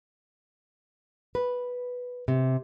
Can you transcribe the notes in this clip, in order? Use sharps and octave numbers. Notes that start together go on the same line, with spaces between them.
B4
C3